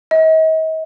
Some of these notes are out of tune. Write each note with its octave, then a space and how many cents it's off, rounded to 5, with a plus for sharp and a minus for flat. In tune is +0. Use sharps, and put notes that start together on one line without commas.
D#5 +40